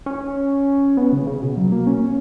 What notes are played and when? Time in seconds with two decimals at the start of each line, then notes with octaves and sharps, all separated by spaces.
0.06 C#4
0.97 B3
1.13 C#3
1.27 C#3
1.42 B2
1.57 F#3
1.72 A#3
1.87 C#4